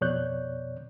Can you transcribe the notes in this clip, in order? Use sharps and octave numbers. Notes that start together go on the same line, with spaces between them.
F2 B2 C#5 D5 F#6 G6